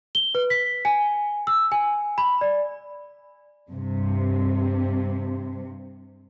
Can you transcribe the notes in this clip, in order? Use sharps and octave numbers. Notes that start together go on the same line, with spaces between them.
G7
B4
B6
G#5
E6
G#5
B5
D5
G2 C3